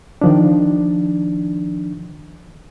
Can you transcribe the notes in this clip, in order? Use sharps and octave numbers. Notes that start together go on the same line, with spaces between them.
D#3 F3 D4